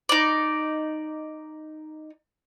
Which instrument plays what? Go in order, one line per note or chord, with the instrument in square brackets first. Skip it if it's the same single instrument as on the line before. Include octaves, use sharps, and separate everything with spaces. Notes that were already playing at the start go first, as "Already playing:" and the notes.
[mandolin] D#4 D5